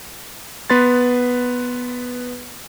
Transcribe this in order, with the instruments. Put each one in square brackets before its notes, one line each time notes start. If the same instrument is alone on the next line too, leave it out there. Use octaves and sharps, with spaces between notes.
[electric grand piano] B3 B4 C6 A6